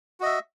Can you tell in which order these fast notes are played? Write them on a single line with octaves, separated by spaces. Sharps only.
F#4 D#5 E5